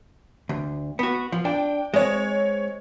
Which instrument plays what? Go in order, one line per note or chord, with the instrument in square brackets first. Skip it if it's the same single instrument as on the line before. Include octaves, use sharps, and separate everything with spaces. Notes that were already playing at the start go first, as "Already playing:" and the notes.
[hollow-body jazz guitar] D2
B3 F#4
F3
[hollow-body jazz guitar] D4 [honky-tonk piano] G5
[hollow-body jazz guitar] G#3 [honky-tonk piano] C4 C#5